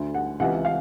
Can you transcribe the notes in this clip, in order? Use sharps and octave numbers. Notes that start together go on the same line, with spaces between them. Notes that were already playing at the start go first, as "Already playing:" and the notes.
Already playing: D2 D3
F#5
C#2 C3 E3 F#5
F5